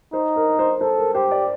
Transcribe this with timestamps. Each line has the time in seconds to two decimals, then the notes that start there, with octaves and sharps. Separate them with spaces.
0.13 D#4 C5
0.36 A#4
0.59 C5
0.81 A4 C5
0.98 A#4
1.14 G4 C5
1.31 D5